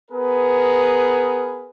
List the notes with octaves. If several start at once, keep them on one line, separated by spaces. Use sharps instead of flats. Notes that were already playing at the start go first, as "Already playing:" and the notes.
B3 G#4 A#4 B4